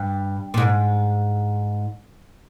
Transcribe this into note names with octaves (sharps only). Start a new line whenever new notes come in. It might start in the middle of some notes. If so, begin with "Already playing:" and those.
Already playing: G2
A#2
G#2